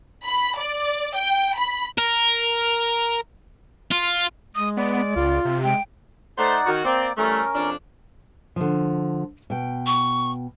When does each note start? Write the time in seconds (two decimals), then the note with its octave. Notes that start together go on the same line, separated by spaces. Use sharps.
0.24 B5
0.57 D5
1.14 G5
1.55 B5
1.98 A#4
3.91 F4
4.55 G#3 D#6
4.77 B3 D5
5.16 C#2 F4
5.45 C3
5.64 G#3 G5
6.38 A3 D#4 C5 D5 F#5
6.67 D#3 F#4
6.85 A#3 C4 D5 D6
7.18 E3 G3 A3 C#4 A#4
7.55 F2 D4
8.56 D3 F3
9.50 B2 G5
9.86 C#6